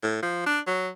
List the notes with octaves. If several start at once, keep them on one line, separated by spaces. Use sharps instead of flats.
A2
F3
D4
F#3